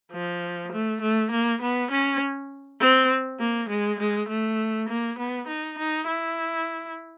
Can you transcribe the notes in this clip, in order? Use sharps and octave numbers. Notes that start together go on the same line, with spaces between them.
F3
A3
A3
A#3
B3
C#4
C4
A#3
G#3
G#3
A3
A#3
B3
D#4
D#4
E4